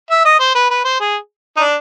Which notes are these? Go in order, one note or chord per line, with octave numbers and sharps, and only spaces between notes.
E5
D#5
C5
B4
B4
C5
G#4
D#4
D4